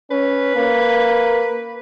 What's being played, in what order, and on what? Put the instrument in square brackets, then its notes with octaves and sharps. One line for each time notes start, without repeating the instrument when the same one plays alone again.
[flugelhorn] C#4 [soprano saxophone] B4
[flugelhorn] A#3